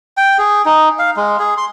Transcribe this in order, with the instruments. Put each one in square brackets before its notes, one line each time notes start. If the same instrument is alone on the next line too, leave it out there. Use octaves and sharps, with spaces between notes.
[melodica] G5
G#4
D#4
F5
G#3
G#4
C6